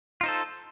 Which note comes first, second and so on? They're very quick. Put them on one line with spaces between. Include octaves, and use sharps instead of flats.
F4 D#4 C5 A4